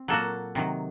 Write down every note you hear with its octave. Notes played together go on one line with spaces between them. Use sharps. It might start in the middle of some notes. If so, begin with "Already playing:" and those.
Already playing: C4
A#2 F#3 A#3 F#4 A4
C3 D#3 F#3